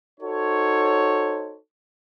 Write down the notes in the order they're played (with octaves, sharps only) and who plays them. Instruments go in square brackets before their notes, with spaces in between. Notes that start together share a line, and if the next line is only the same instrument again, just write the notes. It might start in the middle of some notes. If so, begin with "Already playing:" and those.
[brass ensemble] D#4 F#4 A4 C5 C#5